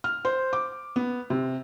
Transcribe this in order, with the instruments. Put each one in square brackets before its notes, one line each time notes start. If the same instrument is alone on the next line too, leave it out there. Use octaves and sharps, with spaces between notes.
[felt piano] F6
C5
D6
B3
C3